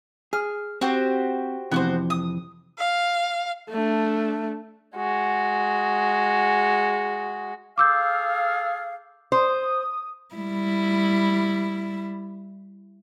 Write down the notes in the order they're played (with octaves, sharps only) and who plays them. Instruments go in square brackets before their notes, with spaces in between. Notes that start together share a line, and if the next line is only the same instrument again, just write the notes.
[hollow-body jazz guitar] G#4 [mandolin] F6
[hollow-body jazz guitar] C4 [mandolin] F#4 G4 C5
[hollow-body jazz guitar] F2 C3 E3 [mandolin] B3 F#4 C5
[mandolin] D#6
[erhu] F5
[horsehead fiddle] A3 D4
[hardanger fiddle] G#3 F#4
[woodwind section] G#4 A4 F5 [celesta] D6 E6 G6
[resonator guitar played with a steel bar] C5 [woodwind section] D#6
[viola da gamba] G3 E4